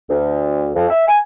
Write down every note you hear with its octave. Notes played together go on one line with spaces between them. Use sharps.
D2
F2
E5
G#5